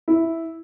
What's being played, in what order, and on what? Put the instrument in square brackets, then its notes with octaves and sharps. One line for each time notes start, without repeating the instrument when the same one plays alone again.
[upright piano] E4